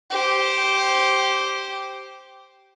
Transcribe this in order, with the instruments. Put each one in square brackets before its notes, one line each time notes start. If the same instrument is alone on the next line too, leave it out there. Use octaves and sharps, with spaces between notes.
[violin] G4 C5